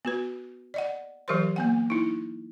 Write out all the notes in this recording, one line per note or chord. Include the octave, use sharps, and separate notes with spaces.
B3 F#4 B4
D5 D#5 F#5
E3 F#3 G4 A#4 C5 C6
A#3 B3 F#5
D#4 E4